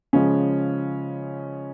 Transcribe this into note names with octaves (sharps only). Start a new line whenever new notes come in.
C#3 F3 G#3 C#4